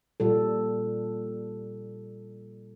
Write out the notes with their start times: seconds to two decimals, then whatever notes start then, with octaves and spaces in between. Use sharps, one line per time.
0.20 A#2 G3 A4